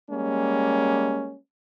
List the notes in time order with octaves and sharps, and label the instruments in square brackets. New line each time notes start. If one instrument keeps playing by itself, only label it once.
[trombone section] G3 G#3 A#3 C#4